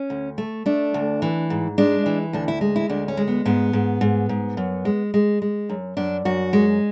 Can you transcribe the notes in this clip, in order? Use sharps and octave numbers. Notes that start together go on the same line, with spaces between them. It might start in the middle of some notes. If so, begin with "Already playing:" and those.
Already playing: C#4
D2
A3
A3 D4
D2
E3
G#2
G#3 D4
E3
D2 D4
E4
G#3
E4
D2 D4
C#4
G#3
B3
G#2 B3
G#2
G#2
G#2
F#2
G#3
G#3
G#3
F#2
F#2 D4
F#2 F#4
G#3